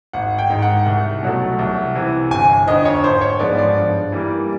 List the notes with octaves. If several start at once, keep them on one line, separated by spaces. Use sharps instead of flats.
G#1 F#5
G5
G#2 D#3
F#5
C2
B2 F#3 A3
C2
C3 E3
G1 G#5
F2 D3 F3 D#5
C#5
G#1 C5
C#5
G#2 F3 G#3 B3 D5
D5
G2
E3 G3 A#3